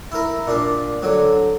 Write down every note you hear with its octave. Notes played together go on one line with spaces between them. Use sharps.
E4 A#4
A#2 D4
D3 F#3